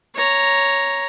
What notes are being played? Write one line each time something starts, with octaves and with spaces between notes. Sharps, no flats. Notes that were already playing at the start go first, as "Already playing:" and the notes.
C#5 A#5